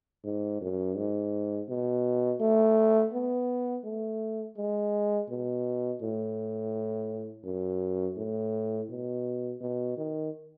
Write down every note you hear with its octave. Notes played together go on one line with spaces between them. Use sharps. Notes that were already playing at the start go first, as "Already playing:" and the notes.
G#2
F#2
G#2
B2
A3
B3
A3
G#3
B2
A2
F#2
A2
B2
B2
D#3